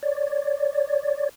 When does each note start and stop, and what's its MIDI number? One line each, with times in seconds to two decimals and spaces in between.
0.03 1.29 73
0.03 1.29 74